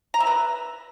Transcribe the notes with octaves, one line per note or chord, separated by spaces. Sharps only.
A#5
E5
B4